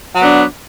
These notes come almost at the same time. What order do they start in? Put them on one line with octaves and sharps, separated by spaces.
F#3 B3 D4